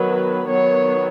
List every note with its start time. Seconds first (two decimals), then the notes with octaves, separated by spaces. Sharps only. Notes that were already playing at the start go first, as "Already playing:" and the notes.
Already playing: D#3 F#3 B3 B4
0.48 D#3 F#3 B3 C#5